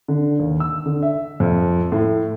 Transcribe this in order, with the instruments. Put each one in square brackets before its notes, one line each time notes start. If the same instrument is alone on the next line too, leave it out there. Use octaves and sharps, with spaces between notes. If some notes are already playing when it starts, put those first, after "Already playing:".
[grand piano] D3
D#2
E6
D3
E5
F2
A2